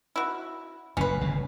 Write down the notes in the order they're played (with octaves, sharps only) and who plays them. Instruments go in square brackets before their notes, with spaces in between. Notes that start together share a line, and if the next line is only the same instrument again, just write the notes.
[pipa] E4 F#4
[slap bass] F#1 A2 [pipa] C#4 B4
[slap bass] G1 C#3